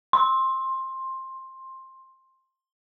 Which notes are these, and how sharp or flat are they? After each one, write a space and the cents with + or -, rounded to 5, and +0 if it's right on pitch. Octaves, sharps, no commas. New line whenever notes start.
C6 +15